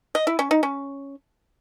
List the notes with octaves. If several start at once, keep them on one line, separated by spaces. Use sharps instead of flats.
D#5
E4
C#4
D#4
C#4